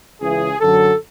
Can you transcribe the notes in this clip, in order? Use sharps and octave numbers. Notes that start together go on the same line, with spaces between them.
C#2 C#3 E3 G#4
F#2 D3 F#3 A4